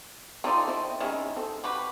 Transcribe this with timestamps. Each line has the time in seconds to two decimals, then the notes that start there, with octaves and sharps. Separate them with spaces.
0.44 A3 C4 D#4 F4 D5
0.68 C4 E4
1.00 D#3 G#3 C#4 E4
1.36 C4 A4
1.64 F#4 G4 B4